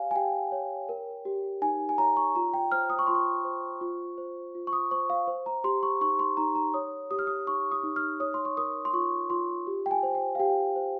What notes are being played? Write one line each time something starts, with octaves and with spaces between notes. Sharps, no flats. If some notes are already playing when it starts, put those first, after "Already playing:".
Already playing: G4 C#5 F5 G#5
G#5
G4 G5
C#5
A#4
G4
D#4 G#5
G#5
C#5 A#5
C#6
F4 A#5
G5
C5 F6
D#6
C#6
F4 C6
C#6
C5
F4
C5
F4
C#6
D#6
C5 C#6
F5
C5
A#5
G4 C6
C#6
D#4 C#6
C6
D#4 A#5
A#5
C#5 D#6
G4 D#6
F6
D#6
D#4 C#6
D#6
D#4
F6
C#5 D#6
C6
C#6
A#4 D#6
C6
F4 C#6
F4 C6
G4
G5
G#5
C5
G5
F5
G4 G5
C5